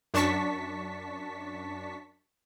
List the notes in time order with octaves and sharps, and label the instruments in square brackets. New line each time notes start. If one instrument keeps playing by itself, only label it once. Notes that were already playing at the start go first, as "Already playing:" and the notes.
[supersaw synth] F#2 D4 A5 C#6 B6